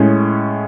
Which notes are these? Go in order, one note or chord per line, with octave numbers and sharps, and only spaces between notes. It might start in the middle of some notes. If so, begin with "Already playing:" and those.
Already playing: A2 G#3 C#4